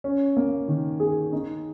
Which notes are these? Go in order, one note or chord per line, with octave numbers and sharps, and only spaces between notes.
C#4
A#3
D#3
G#4
D#4